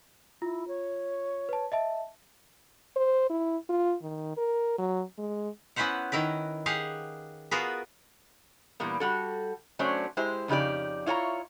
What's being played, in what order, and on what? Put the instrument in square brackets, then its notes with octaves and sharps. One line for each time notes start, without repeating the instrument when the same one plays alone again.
[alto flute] E4 [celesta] F4
[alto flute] C#5
[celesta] B4 A5
D#5 E5 A5
[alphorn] C5
E4
F4
D#3
A#4
F#3
G#3
[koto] B3 C#4 E4 B4 C5 F#5
D#3 E4 A#4 B4
G4 G#4 F5 F#5
B3 F4 F#4 G#4 A#4 B4
[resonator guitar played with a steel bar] A#2 E3 G3 A#3 B3
G3 F#4 A4
F#3 A3 C#4 D4 C5 D5
G#3 E4 G4 C5
F2 C#3 D#4 G4 D5
E4 F4 C#5 G#5 A#5